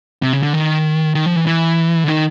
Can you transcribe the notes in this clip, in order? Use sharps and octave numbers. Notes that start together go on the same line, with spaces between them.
C3
C#3
D3
D#3
D#3
F3
E3
E3
D3
D#3